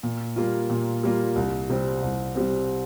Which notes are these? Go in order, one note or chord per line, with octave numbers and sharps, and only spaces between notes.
A#2
G3 A#3 F4
A#2
G3 A#3 F4
C2
C3 G3 C4
C2
C3 G3 C4